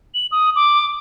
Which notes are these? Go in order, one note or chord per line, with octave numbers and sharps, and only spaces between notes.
F#7
D#6
D6